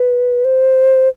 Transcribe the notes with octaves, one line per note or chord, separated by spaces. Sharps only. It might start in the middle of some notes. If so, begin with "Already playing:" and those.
Already playing: B4
C5